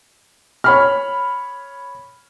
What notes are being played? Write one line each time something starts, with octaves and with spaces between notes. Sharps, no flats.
C#5 B5 F6